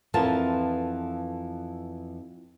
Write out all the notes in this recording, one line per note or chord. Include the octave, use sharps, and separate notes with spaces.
F2 E3 B3 F4 A#4 A5